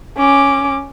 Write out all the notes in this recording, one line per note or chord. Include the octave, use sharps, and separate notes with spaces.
C#4 D6